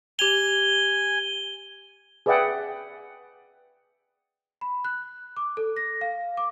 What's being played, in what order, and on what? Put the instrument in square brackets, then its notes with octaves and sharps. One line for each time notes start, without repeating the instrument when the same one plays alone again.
[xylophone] G4 F7 [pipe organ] G#5 [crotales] G7
[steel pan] G#4 B4 D5 E5 F#5 G5
[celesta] B5
F#6
D6
A4
A#6
F5
D6